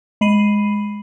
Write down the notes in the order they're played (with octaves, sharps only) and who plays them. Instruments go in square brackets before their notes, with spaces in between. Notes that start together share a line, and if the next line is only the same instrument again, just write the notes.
[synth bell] G#3 B5 C7 D#7 F#7